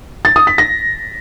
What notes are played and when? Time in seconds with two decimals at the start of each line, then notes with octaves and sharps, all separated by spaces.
0.25 A6
0.36 D#6
0.47 B6
0.58 A#6